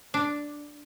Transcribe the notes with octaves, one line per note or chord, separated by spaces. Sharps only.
D4